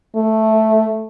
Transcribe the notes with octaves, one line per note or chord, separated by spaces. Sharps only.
A3